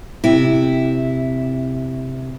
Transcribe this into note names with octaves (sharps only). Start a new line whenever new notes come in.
C3 E4